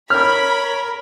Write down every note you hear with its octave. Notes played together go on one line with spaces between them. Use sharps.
A#4 C#5 B5 F6